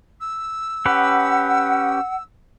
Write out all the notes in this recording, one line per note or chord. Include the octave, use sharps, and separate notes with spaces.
E6
C#4 G4 B4 F#5